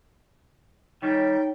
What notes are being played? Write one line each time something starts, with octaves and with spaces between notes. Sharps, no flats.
D#3 G3 C#4 D#4 C#5 G5